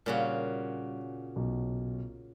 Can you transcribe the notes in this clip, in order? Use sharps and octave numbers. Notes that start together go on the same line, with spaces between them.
A#2 C#3 G3 F#4
B1